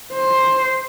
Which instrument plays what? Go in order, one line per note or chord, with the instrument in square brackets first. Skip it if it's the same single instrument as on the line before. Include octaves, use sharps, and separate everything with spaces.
[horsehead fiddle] C5